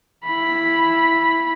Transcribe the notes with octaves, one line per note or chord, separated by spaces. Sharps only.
E4 B5